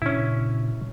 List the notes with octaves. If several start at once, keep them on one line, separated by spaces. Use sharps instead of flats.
A#2 C#3 C#4 D4 E4